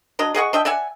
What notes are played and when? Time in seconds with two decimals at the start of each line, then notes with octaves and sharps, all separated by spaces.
0.19 F#3 D4 D#5
0.34 G#4 D#5 F#5 C#6
0.53 D4 D#5 E5 G5
0.65 D5 E5 F#5 G#5